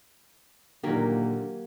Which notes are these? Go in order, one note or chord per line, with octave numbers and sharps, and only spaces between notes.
A#2 D3 D#3 F#3 A#3 G4